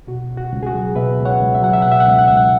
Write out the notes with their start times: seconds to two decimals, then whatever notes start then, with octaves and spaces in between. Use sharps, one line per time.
0.07 B2 F#4
0.29 C#2
0.37 F#4
0.52 C#2
0.63 G#4
0.66 F#4
0.74 F#3
0.96 B2 B4 E5
1.18 C#2
1.25 C#5 F#5
1.41 C#2
1.55 E5
1.62 F#3 F#5
1.73 E5
1.82 B2 F#5
1.92 E5
2.00 F#5
2.07 C#2 E5
2.19 F#5
2.28 C#2 E5
2.37 F#5